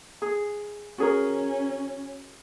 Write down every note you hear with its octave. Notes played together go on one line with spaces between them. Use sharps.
G#4
C#4 F#4 G#4 A#4